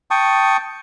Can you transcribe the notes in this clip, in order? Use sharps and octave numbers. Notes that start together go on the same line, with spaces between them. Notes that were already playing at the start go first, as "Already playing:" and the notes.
G5 A5 C#6 D#6